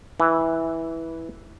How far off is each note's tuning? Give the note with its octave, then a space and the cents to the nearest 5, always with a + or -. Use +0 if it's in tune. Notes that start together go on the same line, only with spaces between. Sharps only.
E3 -10